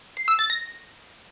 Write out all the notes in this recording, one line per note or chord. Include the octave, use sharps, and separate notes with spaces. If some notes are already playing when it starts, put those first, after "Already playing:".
C7
E6
A6
A#6